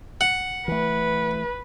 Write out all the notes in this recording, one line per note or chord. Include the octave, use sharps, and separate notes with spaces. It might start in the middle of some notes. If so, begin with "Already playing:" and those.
F#5
E3 A3 B4